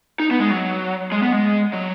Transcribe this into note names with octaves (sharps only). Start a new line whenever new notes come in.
D#4
B3
G#3
F#3
G#3
B3
G#3
F#3